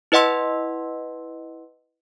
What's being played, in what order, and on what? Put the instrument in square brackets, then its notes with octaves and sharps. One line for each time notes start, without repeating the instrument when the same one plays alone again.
[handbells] E4 B4 D#5 F#5 C6 E6